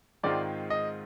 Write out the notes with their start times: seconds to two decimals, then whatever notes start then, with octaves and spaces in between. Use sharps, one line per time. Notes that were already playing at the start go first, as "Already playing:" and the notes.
0.23 G#2 D#3 G#3 C4 F4 D5
0.70 D#5